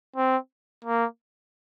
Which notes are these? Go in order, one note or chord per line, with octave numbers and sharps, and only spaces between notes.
C4
A#3